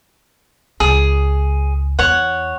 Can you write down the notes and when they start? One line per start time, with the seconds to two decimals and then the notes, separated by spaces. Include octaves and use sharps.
0.80 C#2 G#4
1.99 E2 C#5 F#5